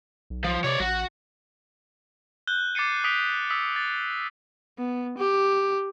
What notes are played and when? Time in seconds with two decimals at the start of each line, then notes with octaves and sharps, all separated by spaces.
0.30 B1
0.44 F3
0.64 C3 C#5 D5
0.80 A1 F#4
2.47 F#6 G6 G7
2.75 D6 A6 C7 C#7 D#7
3.04 D#6 B6 D7 F7 G7
3.50 D#6 E6 B6
3.76 A6
4.79 B3
5.18 G4